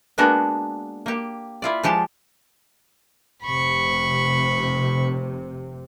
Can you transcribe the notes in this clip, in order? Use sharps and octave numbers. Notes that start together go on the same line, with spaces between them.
G#3 A#3 B3 D4 F#4 A#4
A#3 G4
E4 F4 D5
F3 G#3 G4 A5
F1 C3 B5 C#6